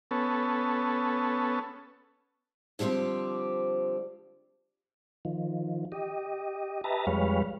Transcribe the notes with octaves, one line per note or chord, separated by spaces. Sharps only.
B3 C#4 A4
D3 F3 G3 C4 G4
D#3 F3
G4 D#5
G4 B4 D#5 E5 A5 A#5
F2 G3 G#3 B4 C#5 F5